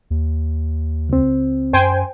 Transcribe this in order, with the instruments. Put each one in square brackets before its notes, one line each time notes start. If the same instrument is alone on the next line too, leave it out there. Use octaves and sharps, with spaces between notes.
[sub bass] D#2
[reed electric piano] C#2 C4
[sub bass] F#2 [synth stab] C5 G5 G#5